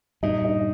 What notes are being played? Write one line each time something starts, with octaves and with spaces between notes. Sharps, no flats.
G2 A#2 D#4
D#4